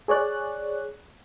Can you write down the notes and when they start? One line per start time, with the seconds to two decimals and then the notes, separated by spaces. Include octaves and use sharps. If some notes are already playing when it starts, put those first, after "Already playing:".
0.08 G#4 C#5 D5 F#6